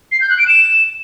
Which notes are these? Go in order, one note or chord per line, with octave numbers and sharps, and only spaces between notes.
C7
G6
F#6
D7
E7